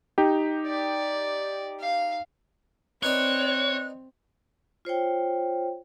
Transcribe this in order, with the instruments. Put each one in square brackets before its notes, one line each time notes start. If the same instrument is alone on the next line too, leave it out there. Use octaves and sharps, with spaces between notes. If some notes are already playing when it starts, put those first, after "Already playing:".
[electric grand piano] D#4 G4
[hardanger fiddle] D5
F5
[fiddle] C4 [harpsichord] D#4 B4 D5 [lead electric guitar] C#5 [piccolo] F#6
[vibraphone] F4 C5 C#5 G5